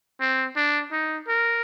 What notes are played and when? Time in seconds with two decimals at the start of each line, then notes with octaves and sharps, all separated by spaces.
0.21 C4
0.56 D4
0.93 D#4
1.29 A#4